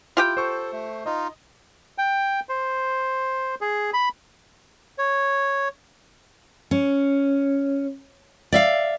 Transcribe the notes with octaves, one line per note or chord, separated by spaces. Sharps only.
E4 F4 G4 G5
A4 C5 C#6
A3
D#4 F4 D#5
G5
C5
G#4
B5
C#5
C#4
D5 E5 F5